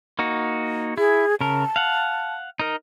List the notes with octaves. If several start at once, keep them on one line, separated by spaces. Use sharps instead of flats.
A#3 D#4 F#4
E4 G#4
C#3 A#4 A5
F5 F#5
D#4 A#4